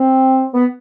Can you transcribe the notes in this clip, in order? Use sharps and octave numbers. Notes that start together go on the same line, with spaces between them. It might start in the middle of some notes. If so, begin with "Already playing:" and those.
Already playing: C4
B3